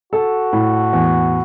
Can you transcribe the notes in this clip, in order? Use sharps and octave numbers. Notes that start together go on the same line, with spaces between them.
F#4 A4
A2
E2